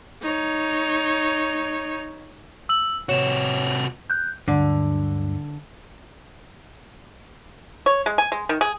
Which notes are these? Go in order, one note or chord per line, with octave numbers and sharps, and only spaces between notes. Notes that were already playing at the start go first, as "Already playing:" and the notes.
D#4 C#5
E6 F#7
C3 F#4 C#5 E7
F#6 G6
D2 G2 D3 F#3
C#5
G#3
G#5
G#3
D#3
G#4